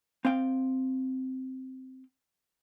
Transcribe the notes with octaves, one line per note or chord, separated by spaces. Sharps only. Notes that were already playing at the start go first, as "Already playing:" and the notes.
C4 F5 G5